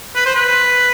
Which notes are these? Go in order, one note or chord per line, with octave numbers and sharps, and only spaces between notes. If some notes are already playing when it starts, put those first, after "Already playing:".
B4
C5
B4